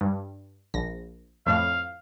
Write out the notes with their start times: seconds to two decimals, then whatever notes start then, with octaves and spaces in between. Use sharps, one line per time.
0.01 G2
0.74 A#1 A#6
1.46 F2 A2 F5